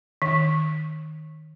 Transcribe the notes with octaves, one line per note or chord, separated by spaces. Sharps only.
D#3